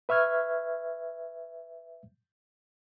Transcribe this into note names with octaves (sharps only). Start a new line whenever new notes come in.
B4 E5 C#6 F6 G#6